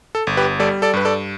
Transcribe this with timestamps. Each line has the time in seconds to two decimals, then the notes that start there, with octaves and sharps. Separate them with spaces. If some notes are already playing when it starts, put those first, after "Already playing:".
0.15 A4
0.27 G1
0.37 G4 B4
0.60 G3 A4 D5
0.82 A4 D5
0.93 G2 B4
1.05 A4 D5